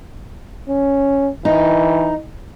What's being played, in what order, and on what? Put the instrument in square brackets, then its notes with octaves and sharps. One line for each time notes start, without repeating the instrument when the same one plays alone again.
[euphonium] C#4
[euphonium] E3 [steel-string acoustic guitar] D#4